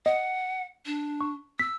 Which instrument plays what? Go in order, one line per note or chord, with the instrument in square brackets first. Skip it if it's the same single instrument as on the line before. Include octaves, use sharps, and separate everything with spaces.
[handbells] D#5 [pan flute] F#5
[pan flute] D4
[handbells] C#6
[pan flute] E6 [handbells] B6